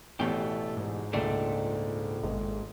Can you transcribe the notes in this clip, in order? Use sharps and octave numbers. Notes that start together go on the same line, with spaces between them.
A1 E2 B2 A3 G4
G#2
C#2 A#2 A3 D4 D5
G#1 G#2